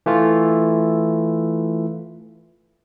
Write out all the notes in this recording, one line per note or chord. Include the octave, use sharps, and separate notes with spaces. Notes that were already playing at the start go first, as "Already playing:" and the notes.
E3 A3 F4